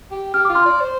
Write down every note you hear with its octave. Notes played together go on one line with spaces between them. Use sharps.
G4
G4 F6
F4 D6
C6 F6
D5
C5